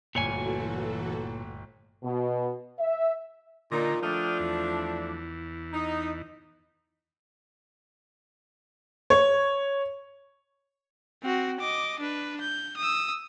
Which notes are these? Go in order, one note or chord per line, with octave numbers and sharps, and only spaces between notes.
G1 D2 A#2 E3 F#4 A4 C#5 G#5
B2
E5
A#2 D3 D#4 A#5
F3 A3 D4 G5 D#6 F6
E2
D#4
C#5
C4 F#4
D#5 D6
D4 B4
G6
D#6 E6